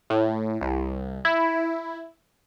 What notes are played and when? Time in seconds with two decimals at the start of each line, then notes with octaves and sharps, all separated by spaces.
0.10 A2
0.61 C2
1.25 E4